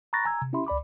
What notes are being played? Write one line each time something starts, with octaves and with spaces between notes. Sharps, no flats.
A#5 B5 C#6 F#6 A6 A#6
G#5 A#5 E6 G#6
C3
C#4 E4 G4 E5 B5 C6
C#2 D5 B5 D6